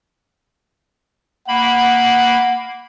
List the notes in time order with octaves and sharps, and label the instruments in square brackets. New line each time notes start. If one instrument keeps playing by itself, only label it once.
[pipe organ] A#3 B5 [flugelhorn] F#5